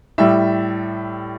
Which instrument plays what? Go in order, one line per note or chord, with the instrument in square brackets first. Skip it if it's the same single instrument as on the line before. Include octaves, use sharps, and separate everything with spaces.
[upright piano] A2 G3 E5